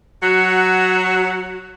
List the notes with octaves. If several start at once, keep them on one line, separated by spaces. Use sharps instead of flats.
F#3 F#4